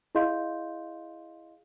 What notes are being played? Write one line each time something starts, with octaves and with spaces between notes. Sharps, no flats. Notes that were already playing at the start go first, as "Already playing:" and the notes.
E4 G#4 D#5 F5 C6 G6